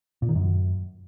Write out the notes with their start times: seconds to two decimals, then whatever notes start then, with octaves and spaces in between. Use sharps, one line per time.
0.22 A#2
0.29 D#3
0.35 F#2